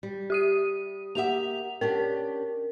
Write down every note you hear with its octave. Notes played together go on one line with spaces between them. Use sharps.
G3
G4 D#6 D#7
A#3 G4 E5 F#5 F7
C#4 D4 G4 A#4